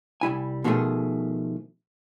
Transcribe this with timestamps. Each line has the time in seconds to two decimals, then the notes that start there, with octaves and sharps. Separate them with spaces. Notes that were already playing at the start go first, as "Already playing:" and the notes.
0.21 C2 G3 E4 G#5
0.64 B2 D#3 F3 G#3 A3 G#4